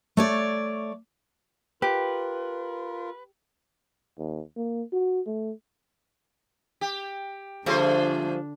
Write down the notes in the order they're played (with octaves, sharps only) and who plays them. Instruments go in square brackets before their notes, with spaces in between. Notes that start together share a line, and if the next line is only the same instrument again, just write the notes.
[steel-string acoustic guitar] A3 C#5 D5
[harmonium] F4 A#4 [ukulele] G4 [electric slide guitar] B4
[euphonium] D#2
A#3
F#4
A3
[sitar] G4
[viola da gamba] D3 D4 [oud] F3 G3 [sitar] A3 G#4 C5